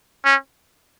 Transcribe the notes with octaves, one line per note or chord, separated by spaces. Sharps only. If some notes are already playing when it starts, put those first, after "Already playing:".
C#4